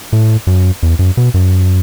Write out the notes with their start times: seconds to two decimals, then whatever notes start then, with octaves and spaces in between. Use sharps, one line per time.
0.13 A2
0.47 F#2
0.83 E2
0.99 F#2
1.17 B2
1.34 F#2